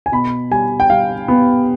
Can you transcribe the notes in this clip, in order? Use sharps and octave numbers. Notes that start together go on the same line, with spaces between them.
G#5
B2 B5
G3 G#5
G5
G3 F5
B3